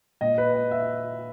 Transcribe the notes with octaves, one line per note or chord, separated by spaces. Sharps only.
A#2 D#5
B4
D#5
E5